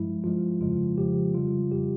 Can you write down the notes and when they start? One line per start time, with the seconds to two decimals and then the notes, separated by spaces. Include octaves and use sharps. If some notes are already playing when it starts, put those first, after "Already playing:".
Already playing: G2 F3 G#3 E4
0.24 G2 F3 G#3 F4
0.61 F2 C#3 F3 G#3 F4
0.98 F2 C#3 F3 G#3 G4
1.34 F2 C#3 G3 F4
1.71 F2 C#3 G3 G4